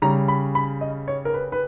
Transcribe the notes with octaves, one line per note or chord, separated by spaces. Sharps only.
C#3 G3 C#4 A#5
B5
B5
D#5
C#5
A#4
B4
B4